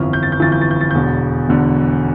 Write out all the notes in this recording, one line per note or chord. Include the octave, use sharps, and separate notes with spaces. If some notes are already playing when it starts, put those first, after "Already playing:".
Already playing: G1 F2 E3 F6
G6
A6
G6
G1 F2 E3 A6
G6
A6
G6
A6
E1 E2 D3 G6
E1 E2 D3